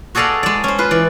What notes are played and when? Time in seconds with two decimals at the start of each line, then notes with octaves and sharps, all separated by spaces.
0.15 F#4 G#4 A4 D5 D#5 F5
0.43 G#3 D5
0.64 C#4 C5
0.79 F4 B4
0.91 E3 D5